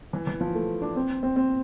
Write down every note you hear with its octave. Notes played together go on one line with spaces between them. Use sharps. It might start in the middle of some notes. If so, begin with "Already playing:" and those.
E3
E3
F3
A3
D4
C4
C4
C4